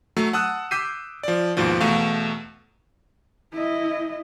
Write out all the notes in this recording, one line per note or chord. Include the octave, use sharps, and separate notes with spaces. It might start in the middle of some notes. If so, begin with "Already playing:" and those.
F#3 A3
F#5 A5 D#6 E6 F#6
D6 E6 G6 B6 C7 D#7
F3 D5
D#2 G#2 B2 F3
E2 B2 A3 F5 C#6
E4 D#5